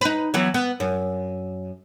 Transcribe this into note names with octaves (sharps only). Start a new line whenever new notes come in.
D#4 B4
E3 F#3 B3
B3
F#2